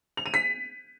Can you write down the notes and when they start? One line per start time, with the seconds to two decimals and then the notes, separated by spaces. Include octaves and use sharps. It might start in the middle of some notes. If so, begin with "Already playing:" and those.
0.17 F7
0.26 D#7
0.34 B6